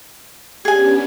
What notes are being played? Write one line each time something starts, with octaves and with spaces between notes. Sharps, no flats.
B3 C#4 D4 G4 G#4 G#5